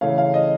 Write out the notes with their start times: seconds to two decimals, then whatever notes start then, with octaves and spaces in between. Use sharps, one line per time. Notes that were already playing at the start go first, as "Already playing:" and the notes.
0.01 C#3 E3 A3 C#4 F5
0.18 F5
0.34 D#5